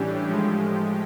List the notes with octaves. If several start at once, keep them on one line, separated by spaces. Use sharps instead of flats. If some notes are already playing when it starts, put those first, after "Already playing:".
Already playing: A2 E3 G3 C#4 D4 G4
A2 F3 G#3